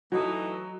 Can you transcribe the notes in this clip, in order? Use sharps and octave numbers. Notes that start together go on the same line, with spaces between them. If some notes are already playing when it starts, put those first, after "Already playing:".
E3 F#3 A3 D#4 F#4 A4